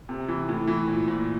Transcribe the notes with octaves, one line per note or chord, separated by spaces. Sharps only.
C3
E3
A2
E3
A#2
A#2